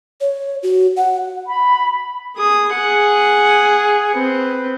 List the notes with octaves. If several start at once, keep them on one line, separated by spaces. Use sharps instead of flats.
C#5
F#4
F#5
B5
G#4 D#6
G#4 F#5
C4 B4